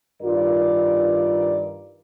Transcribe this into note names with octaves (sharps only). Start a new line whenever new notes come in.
G2 D#3 F4 A#4 D5